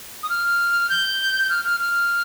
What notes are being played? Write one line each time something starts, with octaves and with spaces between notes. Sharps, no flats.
D#6
F6
G6
F6
F6
F6